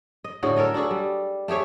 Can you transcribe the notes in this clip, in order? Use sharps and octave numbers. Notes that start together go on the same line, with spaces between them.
D#5
A2 D3 F#4 G#4
A4 A#4 C#5 D#5
D4 F#4 G#4 A4
G3
A3 G4 G#4 C#5